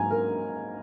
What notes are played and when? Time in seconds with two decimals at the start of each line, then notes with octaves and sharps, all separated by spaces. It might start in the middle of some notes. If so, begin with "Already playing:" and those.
Already playing: G#2 F#3 A#3 G#5 A#5
0.11 A#4